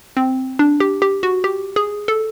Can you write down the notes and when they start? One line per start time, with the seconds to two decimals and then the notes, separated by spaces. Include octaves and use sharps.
0.17 C4
0.59 D4
0.80 G4
1.02 G4
1.23 F#4
1.44 G4
1.76 G#4
2.08 A4